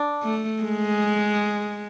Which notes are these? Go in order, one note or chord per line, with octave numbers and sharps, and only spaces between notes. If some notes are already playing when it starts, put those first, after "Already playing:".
Already playing: D4
A3
G#3